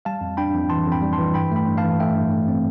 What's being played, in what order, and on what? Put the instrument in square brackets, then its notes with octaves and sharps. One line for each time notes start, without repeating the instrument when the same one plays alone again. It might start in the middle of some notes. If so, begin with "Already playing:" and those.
[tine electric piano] G3 F5 A5
F2
D4 G5 B5
F2
E3 A5 C6
F2
G5 B5
G3
A5 C6
E3
G2 G5 B5
A3 G5 B5
G2
F5 A5
E3
A3 E5 G5
G2
A3
C4